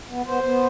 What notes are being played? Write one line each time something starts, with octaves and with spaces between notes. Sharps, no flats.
B3
B3 C5
B3